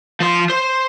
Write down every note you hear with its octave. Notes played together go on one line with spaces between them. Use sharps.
F3 C6
C5